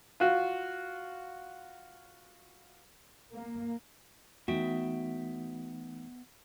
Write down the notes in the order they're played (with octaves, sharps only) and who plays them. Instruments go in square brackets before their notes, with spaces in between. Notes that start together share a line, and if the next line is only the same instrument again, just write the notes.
[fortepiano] F4 F#4
[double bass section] A#3
[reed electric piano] E3 A3 D#4 [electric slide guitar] B3 E5 G5 [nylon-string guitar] F#4